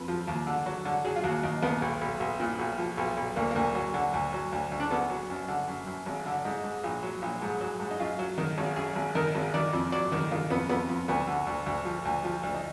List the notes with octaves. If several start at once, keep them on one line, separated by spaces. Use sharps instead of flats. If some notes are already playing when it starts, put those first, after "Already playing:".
Already playing: F2 B4
F3
D#2
D3
F#3
D3
F#3 G#4
F4
D#2 F#4
D#2 D#4
D#2 B3
B1
B1
B1
A#2
B1
F3
B1
B1
D2 A#3
D2 A#3
F#3
D3
D2
F#3
D2
D2
D4
D3 B3
F#3
F#2
D3
F#2
F#2
G#1
D3
G#2 D#4
G#2
A#1
F#3
A#1
G#2
F#3
G#2
D#4
F#2 F4
F#3
D#3
G#1
F#2 G#4
G#1
D#3 A#4
G#1
D#3 D5
F2
F#3 D5
D#3
D#3 F4
F2 B3
F2 B3
F2
D2 B3
D3
D2
D2
F3
D2
F3
D2
D#4